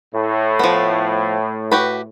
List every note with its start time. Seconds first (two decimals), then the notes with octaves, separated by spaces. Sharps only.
0.14 A2
0.59 F3 B3
1.72 F#4 G4 B4